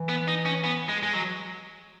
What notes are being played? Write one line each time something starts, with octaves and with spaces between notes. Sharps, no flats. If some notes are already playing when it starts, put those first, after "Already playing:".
Already playing: E3
B3
D#4
C#4
B3
G#3
G#3
F#3